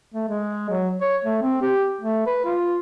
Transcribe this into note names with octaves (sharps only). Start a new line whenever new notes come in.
A3
G#3
F#3
C#5
A3
C4
G4
A3
B4
F4